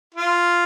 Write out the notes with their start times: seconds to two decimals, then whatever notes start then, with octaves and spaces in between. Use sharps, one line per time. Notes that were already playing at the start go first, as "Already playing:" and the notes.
0.15 F4